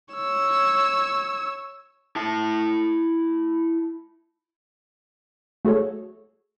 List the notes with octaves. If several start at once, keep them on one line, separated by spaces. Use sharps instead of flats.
C#5 E6
E4 A5
A3 F#4 G#4 A4 C#5